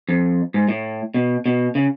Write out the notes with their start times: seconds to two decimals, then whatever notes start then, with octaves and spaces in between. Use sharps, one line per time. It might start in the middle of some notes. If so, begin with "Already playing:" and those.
0.09 F2
0.54 G#2
0.69 A2
1.14 B2
1.46 B2
1.75 C#3